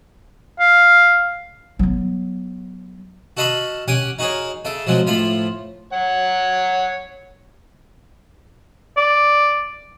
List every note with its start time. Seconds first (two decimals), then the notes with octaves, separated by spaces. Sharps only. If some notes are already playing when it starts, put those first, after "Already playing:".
0.60 F5
1.79 F#3 B3
3.37 F#4 A4 D#5 F5 B5 C#6
3.88 C#4 G4 F#5 G#5 D6
4.19 D#4 F#4 G#4 A#4 C#5
4.65 C#3 A4 E5
4.87 F3 F#3 G#3 C4
5.07 A2 F3 F4 B5
5.93 C#5 F#5
8.97 D5